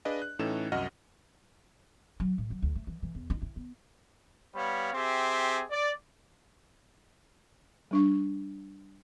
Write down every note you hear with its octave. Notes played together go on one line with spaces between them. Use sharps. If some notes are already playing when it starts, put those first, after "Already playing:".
D4 G#4 B4 D5 D#5 F5
F#6
A2 E3 C#4 D#4 A4 E7
C2 F#2 F#4 D#5 F#5 F6
F#3
A2
F#3
D2
A3
E3
E3
E2
D#4
E4
B3
G3 B3 C#5 F5 B5
C4 G4 G#4 E5 C6
D5
G3 D4 C#6